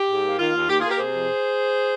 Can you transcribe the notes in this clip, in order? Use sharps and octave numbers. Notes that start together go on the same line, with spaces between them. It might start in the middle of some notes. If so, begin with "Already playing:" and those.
Already playing: G4
G#2
A#3
D#3 F4
D#2
D#2 G4
A#3 F4 G#4
G4 A#4
C3 G#4 C5
F2